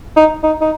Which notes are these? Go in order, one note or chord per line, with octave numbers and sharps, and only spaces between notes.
D#4
D#4
D#4